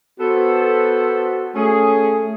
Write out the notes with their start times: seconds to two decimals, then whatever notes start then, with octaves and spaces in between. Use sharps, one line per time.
0.20 B3 F#4 A4 C5
1.56 A3 C#4 G#4